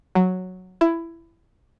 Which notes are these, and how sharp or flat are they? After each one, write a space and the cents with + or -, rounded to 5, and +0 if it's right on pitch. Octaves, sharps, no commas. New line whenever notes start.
F#3 -5
E4 +15